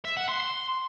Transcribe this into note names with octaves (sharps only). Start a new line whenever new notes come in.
E5
F#5
C6
C6